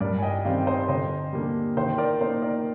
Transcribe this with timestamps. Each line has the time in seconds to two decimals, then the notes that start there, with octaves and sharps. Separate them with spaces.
0.01 G2 A#4 D5
0.18 G#5
0.22 D#5 G5
0.45 D#3 G3 C4 D5 F5
0.67 C5 D#5
0.88 D3 C5 D#5
1.33 G3 A#3 D4
1.77 D#3 C5
1.98 A#4 D5
2.21 A#3 D#4 C5
2.42 A#4 D5